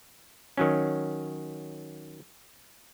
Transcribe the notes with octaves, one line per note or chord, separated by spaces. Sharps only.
D#3 F#3 C#4